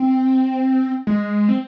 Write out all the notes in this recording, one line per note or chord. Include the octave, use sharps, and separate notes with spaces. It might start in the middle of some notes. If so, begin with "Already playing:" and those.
Already playing: C4
G#3
C4